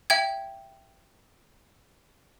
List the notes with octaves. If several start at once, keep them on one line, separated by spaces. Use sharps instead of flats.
E5 G5 G#6